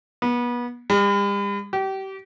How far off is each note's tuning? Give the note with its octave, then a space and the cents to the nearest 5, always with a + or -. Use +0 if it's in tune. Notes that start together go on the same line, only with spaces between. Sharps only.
B3 -30
G3 +45
G4 -30